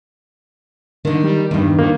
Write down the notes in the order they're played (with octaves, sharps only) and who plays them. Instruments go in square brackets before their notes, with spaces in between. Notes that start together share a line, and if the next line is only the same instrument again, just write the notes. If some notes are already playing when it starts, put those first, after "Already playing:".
[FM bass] D3 [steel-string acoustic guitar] D#3 D#4
[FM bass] G3
[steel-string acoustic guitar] E2 G2 [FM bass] D#3
[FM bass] D#3 [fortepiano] A#3